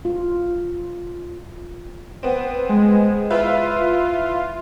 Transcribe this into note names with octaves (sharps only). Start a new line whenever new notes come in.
F4
B3 C4
G#3
E4 F4 B4 E5